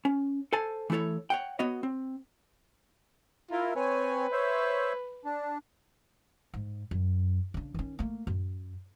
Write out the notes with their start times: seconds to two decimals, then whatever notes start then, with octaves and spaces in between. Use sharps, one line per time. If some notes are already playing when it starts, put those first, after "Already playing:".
0.05 C#4
0.53 A4 C5 G#5 A5
0.90 E3 A3 E4 A4 C#5
1.30 C#5 F#5 G5
1.59 B3 F#4 C#5 D#5
1.83 C4
3.51 E4 F4 A#4
3.76 C4 B4 C#5 G#5
4.32 C5 C#5 E5
5.25 D4
6.54 G#2
6.91 F#2
7.54 C#3 D4
7.74 D#3 C#4
7.99 A3 A#3
8.27 F#2